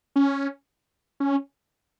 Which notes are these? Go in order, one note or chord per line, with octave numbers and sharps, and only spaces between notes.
C#4
C#4